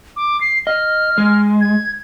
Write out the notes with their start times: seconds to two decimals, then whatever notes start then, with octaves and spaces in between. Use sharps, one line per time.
0.16 D6
0.41 C7
0.67 D#5 F6
1.18 G#3
1.61 G#6